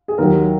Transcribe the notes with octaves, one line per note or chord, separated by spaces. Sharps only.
G#4
D#2 D#3 F#3 A#4